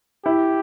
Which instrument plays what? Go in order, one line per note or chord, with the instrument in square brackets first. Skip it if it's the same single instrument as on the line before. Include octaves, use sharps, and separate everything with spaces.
[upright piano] E4 [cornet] G4